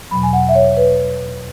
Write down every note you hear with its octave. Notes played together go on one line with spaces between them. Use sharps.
E2 B2 F#3 B5
G#5
F#5
E5
C#5
B4